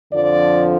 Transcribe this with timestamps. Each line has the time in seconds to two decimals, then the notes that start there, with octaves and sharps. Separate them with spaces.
0.13 F2 D3 F3 D5